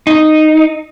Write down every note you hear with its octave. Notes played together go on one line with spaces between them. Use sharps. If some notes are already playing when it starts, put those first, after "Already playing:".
D#4